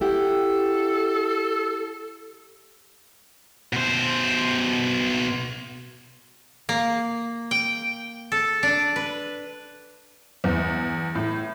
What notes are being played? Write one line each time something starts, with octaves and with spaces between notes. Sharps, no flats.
E4 G4 A4 F#5
B2 C5
A#3
G5
A4
D4
B4
E2
A2